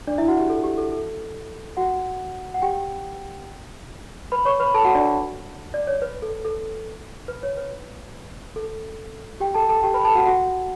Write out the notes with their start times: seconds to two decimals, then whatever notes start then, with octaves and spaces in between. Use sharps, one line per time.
0.07 D4 D5
0.18 E4 E5
0.28 F#4 F#5
0.39 G4
0.50 A4
0.63 G4
0.78 A4
0.92 A4
1.77 F#4 F#5
2.54 F#5
2.62 G4 G5
4.32 B4 B5
4.45 C#5 C#6
4.60 B4 B5
4.74 A4 A5
4.85 F#4 F#5
4.95 D4 D5
5.74 D5
5.87 C#5
6.02 B4
6.22 A4
6.44 A4
7.28 B4
7.43 C#5
7.57 B4
8.56 A4
9.40 G4 G5
9.55 A4 A5
9.69 A4 A5
9.83 G4 G5
9.94 B4 B5
10.05 A4 A5
10.15 F#4 F#5
10.26 F#4 F#5